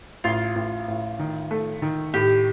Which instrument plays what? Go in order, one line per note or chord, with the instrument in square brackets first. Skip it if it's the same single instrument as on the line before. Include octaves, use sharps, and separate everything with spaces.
[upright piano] A1 [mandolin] F4
[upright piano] A1
A1
D#3
A3
D#3
[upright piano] A2 [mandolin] G4